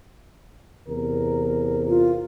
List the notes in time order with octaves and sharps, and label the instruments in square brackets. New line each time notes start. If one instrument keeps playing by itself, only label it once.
[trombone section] E2 C3 A#4
[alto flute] F4